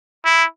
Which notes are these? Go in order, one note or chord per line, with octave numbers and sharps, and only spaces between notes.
E4